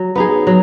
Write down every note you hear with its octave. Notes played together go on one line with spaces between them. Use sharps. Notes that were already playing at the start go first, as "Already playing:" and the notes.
Already playing: F#3
B3 D#4 G#4
F#3